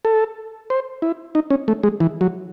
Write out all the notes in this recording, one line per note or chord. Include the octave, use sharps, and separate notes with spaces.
A4
C5
E4
D#4
C#4
A3
G#3
E3
F#3